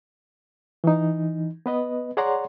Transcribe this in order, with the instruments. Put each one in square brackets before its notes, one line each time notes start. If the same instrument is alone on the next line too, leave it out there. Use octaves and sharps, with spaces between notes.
[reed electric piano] E3 D#4
B3 B4 D#5
G#4 C#5 D5 F#5 A#5 C6